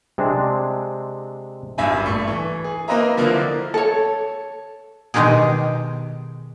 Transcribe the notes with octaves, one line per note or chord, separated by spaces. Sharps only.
C3 G#3 C4 D4
G#1 G2 E5 G#5 B5
A#1 A3 C#6
E3
G#4
A#3 C4 B4 D#5 E5 A#5
D3 F3 A#3 E4 F5
A4 C#5
B2 D#3 G#3 D#4 G4 G#4